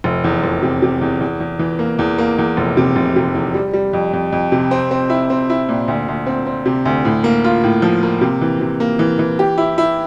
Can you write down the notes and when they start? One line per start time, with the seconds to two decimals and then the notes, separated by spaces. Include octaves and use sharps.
0.04 F1
0.24 E2
0.44 F1
0.63 C3
0.82 C3
1.01 E2
1.21 E2
1.40 E2
1.59 E3
1.79 A#3
1.99 E2
2.18 A#3
2.38 E2
2.57 F1
2.77 C3
2.96 F1
3.16 C3
3.34 E2
3.54 G3
3.73 G3
3.93 F2
4.13 F2
4.32 F2
4.52 C3
4.71 C4
4.91 C4
5.10 E4
5.30 C4
5.50 E4
5.69 A#2
5.88 D2
6.08 D2
6.27 C4
6.47 C4
6.66 C3
6.85 D2
7.05 A2
7.24 A#3
7.44 F4
7.64 A2
7.82 F3
8.03 A#3
8.21 C3
8.41 E3
8.61 C3
8.80 A#3
8.99 E3
9.19 E3
9.39 G4
9.58 E4
9.78 E4